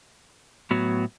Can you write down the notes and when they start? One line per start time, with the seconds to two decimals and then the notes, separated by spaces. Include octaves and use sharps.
0.71 A2 F#3 B3 F#4